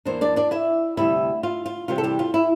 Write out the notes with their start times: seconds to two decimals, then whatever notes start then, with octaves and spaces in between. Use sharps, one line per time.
0.05 E2 E3 A#3 D4 C5
0.21 D4 D5
0.36 D4 D5
0.51 E4 E5
0.97 D2 C3 G3 E4 E5
1.43 F4
1.66 F4
1.88 C3 E3 G3 C4 F4
1.98 A4
2.04 G3 G4
2.19 F4
2.34 E4